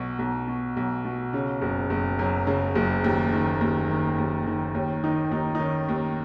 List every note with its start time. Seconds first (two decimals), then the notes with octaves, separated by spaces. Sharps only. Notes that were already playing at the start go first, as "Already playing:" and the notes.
Already playing: B1 B2
0.19 B1
0.48 B2
0.77 B1
1.05 B2
1.33 C#3 C#4
1.62 F#1
1.90 F#1
2.19 F#2
2.47 C#3
2.75 F#1
3.04 D#2
3.32 D#3
3.61 D#2
3.90 D#3
4.18 D#2
4.47 D#3
4.75 D#2 C#4
5.03 D#3 D#4
5.31 D#2 D#4
5.55 D#4
5.59 D#3 C#4
5.89 D#2